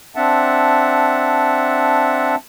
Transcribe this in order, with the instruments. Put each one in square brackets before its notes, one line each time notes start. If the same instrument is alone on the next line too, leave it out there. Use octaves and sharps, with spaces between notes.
[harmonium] C4 D4 E5 F#5 A5